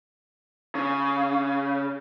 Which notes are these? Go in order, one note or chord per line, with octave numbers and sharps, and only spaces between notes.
C#3